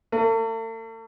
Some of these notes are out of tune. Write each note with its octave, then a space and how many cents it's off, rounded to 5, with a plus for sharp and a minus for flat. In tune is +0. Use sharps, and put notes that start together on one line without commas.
A3 +45